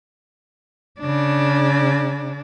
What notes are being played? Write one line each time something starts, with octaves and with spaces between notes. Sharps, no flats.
C#3 D4